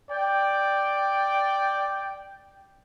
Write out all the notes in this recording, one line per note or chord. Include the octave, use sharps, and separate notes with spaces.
D5 G5